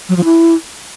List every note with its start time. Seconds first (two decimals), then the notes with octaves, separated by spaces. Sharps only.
0.09 F#3
0.17 F3
0.24 E4